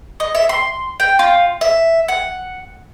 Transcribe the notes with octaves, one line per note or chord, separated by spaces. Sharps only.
D#5
E5
C6
G5
F4
E5
F#5